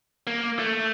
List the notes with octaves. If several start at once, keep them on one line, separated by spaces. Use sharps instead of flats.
A#3
A3